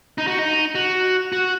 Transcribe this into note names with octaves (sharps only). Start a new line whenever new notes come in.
D#4
F#4
D#4
F#4
F#4